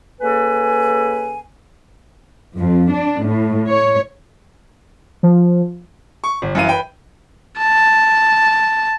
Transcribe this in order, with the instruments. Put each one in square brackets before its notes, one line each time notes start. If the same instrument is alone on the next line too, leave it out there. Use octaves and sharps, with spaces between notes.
[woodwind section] C#3 A#3 A4 B4 G#5
[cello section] F2
D4
A2
C#5
[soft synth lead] F3
[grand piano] C#6
G1
F#2 E3 F5 D#7
B4 G5
[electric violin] A5